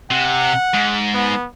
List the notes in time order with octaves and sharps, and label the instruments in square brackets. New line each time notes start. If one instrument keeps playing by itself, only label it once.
[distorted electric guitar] C3 [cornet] F#5
[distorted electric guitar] G#2
[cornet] B3